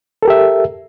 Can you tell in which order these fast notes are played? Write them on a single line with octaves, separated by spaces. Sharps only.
A4 A#4 G4 E5